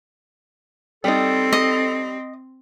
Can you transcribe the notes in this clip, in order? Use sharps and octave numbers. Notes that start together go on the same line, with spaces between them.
G3 C4 D#4 A4
D#5